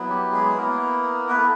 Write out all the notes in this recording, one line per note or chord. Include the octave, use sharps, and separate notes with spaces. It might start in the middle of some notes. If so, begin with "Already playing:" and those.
Already playing: F#3 B3 E4
G4
G#3 G#4
A#3 B3 E4 A#4
B3 E4 B4
A4